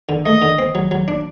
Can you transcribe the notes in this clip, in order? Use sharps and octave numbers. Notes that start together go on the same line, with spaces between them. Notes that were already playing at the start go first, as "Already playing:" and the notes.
D3
A3 D#5
D3
C4
F#3
F#3
D4